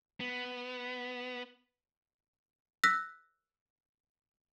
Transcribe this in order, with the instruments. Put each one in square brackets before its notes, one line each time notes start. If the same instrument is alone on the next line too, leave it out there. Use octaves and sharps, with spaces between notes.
[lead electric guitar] B3
[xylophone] E6 F#6 A#6 B6